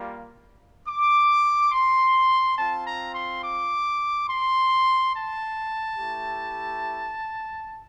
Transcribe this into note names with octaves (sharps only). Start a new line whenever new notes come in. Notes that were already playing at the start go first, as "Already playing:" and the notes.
Already playing: G3 A#3 F4
D6
C6
C4 F4 A5
A#5
C6
D6
C6
A5
A3 E4 G4